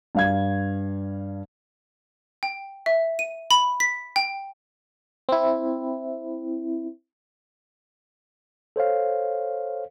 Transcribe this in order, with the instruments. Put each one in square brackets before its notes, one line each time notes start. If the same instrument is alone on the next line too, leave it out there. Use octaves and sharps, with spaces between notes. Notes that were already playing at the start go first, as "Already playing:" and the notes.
[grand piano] G2 F5 G#6
[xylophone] G5
E5
D#7
B5
B6
G5
[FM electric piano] C4 E4
[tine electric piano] A4 C5 C#5 F5